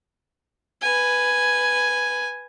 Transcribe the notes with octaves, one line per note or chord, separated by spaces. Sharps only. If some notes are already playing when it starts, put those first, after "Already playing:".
B4 G#5